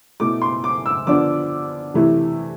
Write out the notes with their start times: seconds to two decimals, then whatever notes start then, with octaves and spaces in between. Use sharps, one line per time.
0.20 B2 A3 E4 D6
0.42 C6
0.64 D6
0.86 E6
1.07 D3 F3 B3 D4 D6
1.94 C3 E3 A3 E4